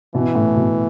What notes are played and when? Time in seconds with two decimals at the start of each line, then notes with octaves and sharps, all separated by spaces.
0.15 B2 E3
0.35 A2
0.57 B2